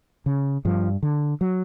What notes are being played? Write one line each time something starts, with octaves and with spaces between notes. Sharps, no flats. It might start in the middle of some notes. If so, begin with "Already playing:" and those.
C#3
G2 F3
D3
F#3